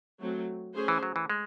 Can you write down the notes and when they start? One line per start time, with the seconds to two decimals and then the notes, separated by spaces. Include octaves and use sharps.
0.20 F#3 A3 C4
0.75 A3 C#4 G#4 C5
0.88 E3
1.03 F#3
1.16 E3
1.30 G#3